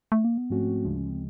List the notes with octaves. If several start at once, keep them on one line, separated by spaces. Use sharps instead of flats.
A3
A#3
B3
G#2 F3 A3 C4 C#4 F#4
D2 C#3 F3 G#3 D4
C#4
C4